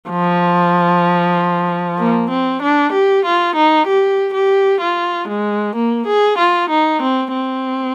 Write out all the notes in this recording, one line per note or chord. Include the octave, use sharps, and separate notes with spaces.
F3
A#3
C4
D4
G4
F4
D#4
G4
G4
F4
G#3
A#3
G#4
F4
D#4
C4
C4